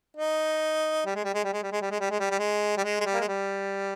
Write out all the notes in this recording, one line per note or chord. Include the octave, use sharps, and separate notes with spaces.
D#4
G3
G#3
G3
G#3
G3
G#3
G3
G#3
G3
G#3
G3
G#3
G3
G3
G#3
G3
G#3
G#3
G3
A#3
G#3
G3